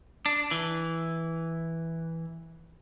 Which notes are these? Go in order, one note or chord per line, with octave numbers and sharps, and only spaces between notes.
D4
E3